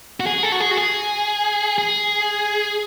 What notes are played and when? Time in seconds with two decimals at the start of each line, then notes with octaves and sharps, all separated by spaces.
0.20 F#4
0.26 G#4
0.43 A4
0.52 F#4
0.60 G#4
0.71 F#4
0.77 G#4
1.78 G#4